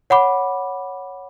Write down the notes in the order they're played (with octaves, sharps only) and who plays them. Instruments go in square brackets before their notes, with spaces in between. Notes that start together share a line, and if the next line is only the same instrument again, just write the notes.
[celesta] C#5 F#5 B5 D6